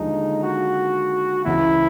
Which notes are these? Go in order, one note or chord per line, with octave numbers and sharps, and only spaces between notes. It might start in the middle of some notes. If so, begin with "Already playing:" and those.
Already playing: D#2 D3 F3 G#3 D#4
F#4
C#2 C#3 E3 E4